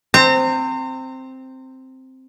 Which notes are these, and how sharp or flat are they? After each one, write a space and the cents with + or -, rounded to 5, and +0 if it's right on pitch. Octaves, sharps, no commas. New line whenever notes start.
C4 +0 A#5 -35